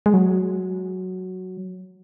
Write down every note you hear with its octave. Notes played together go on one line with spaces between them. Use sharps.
G#3
F#3